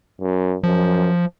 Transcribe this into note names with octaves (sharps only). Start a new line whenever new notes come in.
F#2
F#2 F3